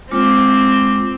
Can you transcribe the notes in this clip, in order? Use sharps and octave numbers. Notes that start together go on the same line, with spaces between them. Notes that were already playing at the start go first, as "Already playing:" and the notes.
G#3 C4 F4 D6